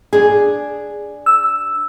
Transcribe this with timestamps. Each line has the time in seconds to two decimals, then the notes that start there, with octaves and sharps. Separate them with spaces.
0.13 D4 G#4
1.26 E6